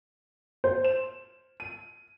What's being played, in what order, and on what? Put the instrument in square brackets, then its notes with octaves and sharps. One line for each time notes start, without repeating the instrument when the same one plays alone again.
[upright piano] C5
E7
D#7